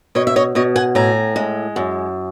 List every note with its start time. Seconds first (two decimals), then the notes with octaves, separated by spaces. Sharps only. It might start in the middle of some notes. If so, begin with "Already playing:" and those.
0.15 B2 C#5 D#5
0.27 E5
0.36 C#5 D#5
0.55 B2 C#5 D#5
0.76 F#5 G#5
0.95 A2 G#5 A#5
1.36 G#3
1.76 F#2